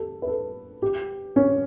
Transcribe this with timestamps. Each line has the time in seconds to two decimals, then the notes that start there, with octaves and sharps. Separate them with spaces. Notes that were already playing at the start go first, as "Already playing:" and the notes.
Already playing: G4 A4
0.22 B4
0.27 A4
0.82 G4
1.36 C#4